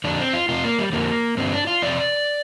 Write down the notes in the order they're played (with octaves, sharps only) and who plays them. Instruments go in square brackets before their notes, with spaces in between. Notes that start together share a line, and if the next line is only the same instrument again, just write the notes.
[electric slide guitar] F2 D3 D4
C4
F4
F2 C3 F4
A#3
G3
F2 D3 A#3
G2 D3 C4
D4
F4
F2 C3 D5